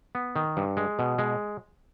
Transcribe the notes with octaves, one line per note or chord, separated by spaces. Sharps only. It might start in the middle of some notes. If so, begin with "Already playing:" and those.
B3
D#3
G2
G#3
B2
G#3